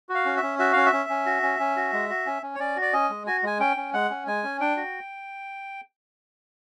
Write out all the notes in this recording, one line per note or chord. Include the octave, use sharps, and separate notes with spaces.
F#4
F5
C#4
E5
C#4
F#4 E5
C#4 F5
E5
C#4
C#4
F#4
C#4
C#4
F#4
G#3
F#4
C#4
C#4
C#5
C#4 D5
F#4 D5
C#4 D#5
G#3
F#4 G#5
G#3 G#5
C#4 G5
C#4
G#3 F#5
C#4
G#3 G#5
C#4
D4 G5
F#4